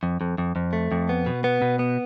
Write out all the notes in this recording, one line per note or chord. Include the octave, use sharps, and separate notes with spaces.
F2
F2
F2
F2
A3
F2
B3
B2
B3
B2
B3